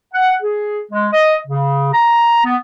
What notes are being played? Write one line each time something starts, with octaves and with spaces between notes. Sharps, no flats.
F#5
G#4
G#3
D#5
C#3
A#5
B3